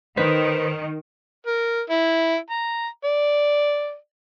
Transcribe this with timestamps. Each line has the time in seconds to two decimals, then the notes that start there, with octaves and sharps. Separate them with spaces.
0.17 D#3 B4 C5 B6
1.46 A#4
1.90 E4
2.51 A#5
3.04 D5